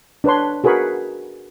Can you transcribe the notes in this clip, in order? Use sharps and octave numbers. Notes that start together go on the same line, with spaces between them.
D4 B4 C#5 C6
F#4 G#4 A#4 B4 B5 C#6